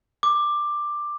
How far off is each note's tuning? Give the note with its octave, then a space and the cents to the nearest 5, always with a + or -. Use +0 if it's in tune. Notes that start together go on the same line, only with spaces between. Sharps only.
D6 +10